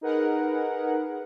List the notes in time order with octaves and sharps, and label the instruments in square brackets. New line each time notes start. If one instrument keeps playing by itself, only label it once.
[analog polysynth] D#4 G#4 A#4 B4 F#5